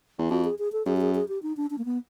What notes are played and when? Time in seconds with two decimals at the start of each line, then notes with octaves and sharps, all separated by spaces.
0.18 E2
0.30 F2 F#4
0.44 G#4
0.59 G#4
0.72 A4
0.86 F#2 G#4
0.97 G4
1.01 G#4
1.15 G#4
1.29 G4
1.43 D#4
1.57 D4
1.70 D4
1.78 A#3
1.85 B3